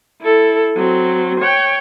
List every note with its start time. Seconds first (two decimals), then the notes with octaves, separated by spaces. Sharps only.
0.22 E4 A4
0.76 F#3 C4
1.40 C#5 G5